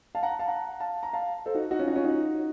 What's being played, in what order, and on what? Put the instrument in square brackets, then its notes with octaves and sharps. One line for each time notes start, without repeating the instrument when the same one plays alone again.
[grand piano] F5 A5
F#5 A#5
F5 A5
F#5 A#5
F5 A5
A#5
F5 A5
A4 C5
D#4 F#4
D#4 F#4
C#4 F4
D#4 F#4
C#4 F4
D#4 F#4